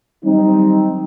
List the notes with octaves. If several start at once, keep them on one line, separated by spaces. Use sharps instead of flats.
D#3 F#3 G3 C4 D#4